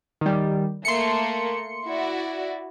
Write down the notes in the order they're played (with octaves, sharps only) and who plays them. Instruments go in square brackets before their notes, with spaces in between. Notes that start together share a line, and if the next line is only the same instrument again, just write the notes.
[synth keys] D#3 G3
[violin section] A3 A#3 [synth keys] C6 C#7
[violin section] E4 F#4 D5